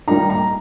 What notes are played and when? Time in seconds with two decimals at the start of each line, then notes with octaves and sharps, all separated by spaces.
0.07 D#3 G3 A#3 D#4 A#5
0.30 A#5